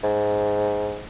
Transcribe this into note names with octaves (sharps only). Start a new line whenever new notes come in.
G#2